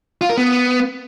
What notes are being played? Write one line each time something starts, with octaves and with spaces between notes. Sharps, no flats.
F4
A#4
B3